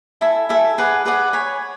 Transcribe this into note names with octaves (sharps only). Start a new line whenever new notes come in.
E4 A4 E5 G#5
E4 A4 E5 G#5
G#4 B4 D5 F#5
G#4 B4 D5 F#5
C#5 G#5 B5